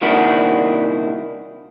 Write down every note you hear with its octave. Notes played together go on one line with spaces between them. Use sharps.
C2 A#2 D#3 D4 E4 F#4